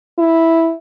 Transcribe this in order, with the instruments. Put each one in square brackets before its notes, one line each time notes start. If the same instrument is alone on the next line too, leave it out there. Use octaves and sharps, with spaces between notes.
[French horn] E4